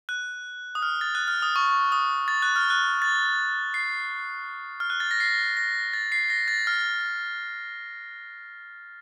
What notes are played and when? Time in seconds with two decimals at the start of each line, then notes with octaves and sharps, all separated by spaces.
0.09 F#6
0.75 D#6
0.82 F6
1.01 A6
1.15 F#6
1.28 F6
1.42 D#6
1.56 C#6
1.92 D#6
2.28 A6
2.42 F#6
2.56 F6
2.70 F#6
3.02 A6
3.74 C7
4.80 F6
4.90 F#6
5.00 A6
5.11 A#6
5.20 C7
5.57 A#6
5.93 A6
6.12 C7
6.30 A#6
6.48 A6
6.67 F6